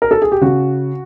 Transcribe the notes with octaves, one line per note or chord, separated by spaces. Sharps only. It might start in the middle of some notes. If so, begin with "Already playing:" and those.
A#4
A4
G#4
G4
C#3 F#4